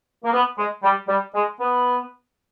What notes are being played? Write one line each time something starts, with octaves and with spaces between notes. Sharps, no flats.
A#3
B3
G#3
G3
G3
G#3
B3